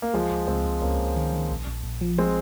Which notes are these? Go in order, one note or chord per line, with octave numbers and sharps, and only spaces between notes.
A#3
C#2 F3 G#3
C#2
C#2 G#3 C4
C#2
C#2 A#3 C#4
C#2
D#3
D#3
A#1
A#1
A#1
F3
F3 G#3 C4